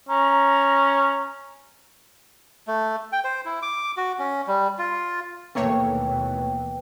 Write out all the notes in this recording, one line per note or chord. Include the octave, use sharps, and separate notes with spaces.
C#4 A#5
A3
G5
C5
E4
D6
F#4
C#4
G3
F4
D#2 B2 E3 A3 A#3 B4 C#5 G5